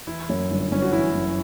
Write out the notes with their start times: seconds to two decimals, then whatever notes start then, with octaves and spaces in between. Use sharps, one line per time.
0.07 E3 E4
0.29 F#2
0.51 G1
0.71 G1 C#4
0.82 F#4
0.93 E3 E4
1.15 F#2